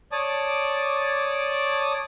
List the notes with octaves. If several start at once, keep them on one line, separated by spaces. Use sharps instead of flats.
C#5 D5 A5 D6 D#6